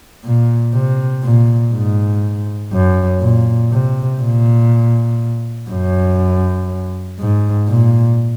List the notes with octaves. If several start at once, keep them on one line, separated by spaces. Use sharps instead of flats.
A#2
C3
A#2
G#2
F#2
A#2
C3
A#2
F#2
G#2
A#2